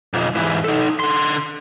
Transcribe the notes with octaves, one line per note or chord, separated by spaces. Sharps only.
B1 F2
G#2 E3
D#4 A4
D3 C6